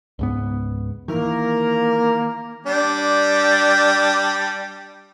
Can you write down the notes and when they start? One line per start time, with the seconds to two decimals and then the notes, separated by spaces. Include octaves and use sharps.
0.19 C#2 G#2 B3
1.08 D#3 E3 A#3 A#4
2.66 G3 D4